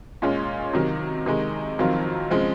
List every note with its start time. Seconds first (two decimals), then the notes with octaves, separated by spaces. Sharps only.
0.22 A#2 G#3 C#4
0.73 C3 D#3 F#3
1.26 C3 D#3 G#3
1.79 F2 D#3 F#3 C4 F4
2.31 C#3 F3 G#3 C4